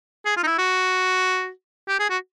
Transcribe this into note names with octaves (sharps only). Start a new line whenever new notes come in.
G#4
F4
D#4
E4
F#4
G4
G#4
F#4